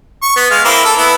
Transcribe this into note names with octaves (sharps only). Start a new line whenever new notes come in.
C#6
B3
G#3 F5
A#3 C4 E4
A4
B3 E4